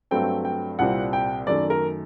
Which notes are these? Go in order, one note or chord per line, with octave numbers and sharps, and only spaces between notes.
G2 F#3 A3 C4 G5
G5
C2 A#2 G3 C4 F#5
G5
F#2 D#3 A3 D5
A#4